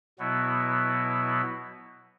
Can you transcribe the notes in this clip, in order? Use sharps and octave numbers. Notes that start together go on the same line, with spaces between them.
B2 F#3 B3 E4